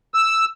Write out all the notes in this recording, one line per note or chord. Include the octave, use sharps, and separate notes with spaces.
E6